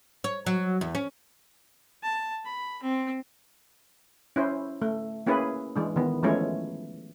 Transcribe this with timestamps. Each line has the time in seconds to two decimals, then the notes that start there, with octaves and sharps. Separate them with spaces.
0.24 C#5
0.47 F#3
0.81 E2
0.95 C#4
2.03 A5
2.45 B5
2.83 C4
4.36 C#4 E4 C5
4.82 A3
5.26 A#3 C#4 E4 G#4 B4
5.76 E3 G#3 D4
5.96 D#3 E3 B3
6.23 E3 F3 G#3 A3 C#4 C#5